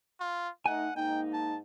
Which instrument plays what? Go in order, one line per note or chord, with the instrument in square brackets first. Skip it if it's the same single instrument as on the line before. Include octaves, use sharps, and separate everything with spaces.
[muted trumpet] F4
[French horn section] A3 D#4 [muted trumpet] F#5 [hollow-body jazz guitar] G#5
[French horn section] G#2 A#3 D#4 [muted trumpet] G5
[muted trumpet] A5